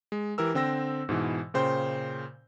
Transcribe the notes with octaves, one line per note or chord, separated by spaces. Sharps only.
G#3
E3 G4 A#4 E6
D3 C4 G5 E6 A#6
G#2 B2 E3
A#2 C#3 C5 G5 C6 G6